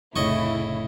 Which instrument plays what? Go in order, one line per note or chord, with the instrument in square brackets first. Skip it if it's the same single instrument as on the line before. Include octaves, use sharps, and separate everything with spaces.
[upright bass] F1 [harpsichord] A2 D#5 C#6 [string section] C#3 E4